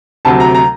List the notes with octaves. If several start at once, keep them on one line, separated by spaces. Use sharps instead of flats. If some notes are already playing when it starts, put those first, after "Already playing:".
D2 C3 F#3 A5
A#5
A#5